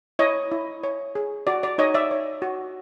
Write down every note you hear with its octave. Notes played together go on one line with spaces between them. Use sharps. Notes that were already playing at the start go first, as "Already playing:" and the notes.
E4 C#5 D#5
E4
C#5
G#4
F#4 D5
D5
D#4 C#5 D#5
D5 E5
C#5
F#4